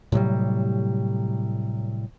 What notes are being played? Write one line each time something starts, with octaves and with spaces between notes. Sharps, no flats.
A2 C3 F#3 G3